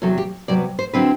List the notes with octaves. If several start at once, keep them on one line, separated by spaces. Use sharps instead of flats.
E2 C3 F#3 A4
G4
C3 F#3 B3 D5
C5
D3 F#3 C4 E4 B4